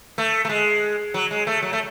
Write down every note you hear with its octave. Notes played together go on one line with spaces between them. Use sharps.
A3
A3
G#3
F#3
G#3
A3
F#3
A3